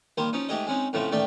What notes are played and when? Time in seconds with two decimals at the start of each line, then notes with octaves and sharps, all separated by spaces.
0.18 D#3 G3 A#3 C5
0.33 F3 C#4 D#4
0.49 G#2 A3 G4 G#4 D#5
0.67 G#3 C4 C#4 D#4
0.93 A2 C#3 F3 A3 C4
1.12 A1 D#3 A3 D5 E5 G5